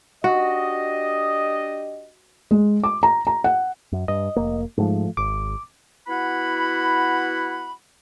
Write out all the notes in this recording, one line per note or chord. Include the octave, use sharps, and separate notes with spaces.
D4 F#4 G4 D#5
G#3
D6
A#5
A#5
F#5
F#2
G2 D#5
F1 A#3
G#2 F3 F#3 A3
G#1 D6
B3 E4 F#4 F#5 B5